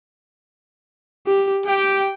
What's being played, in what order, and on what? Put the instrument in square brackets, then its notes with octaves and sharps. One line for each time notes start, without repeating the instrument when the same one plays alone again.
[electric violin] G4
[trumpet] G4 [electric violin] G5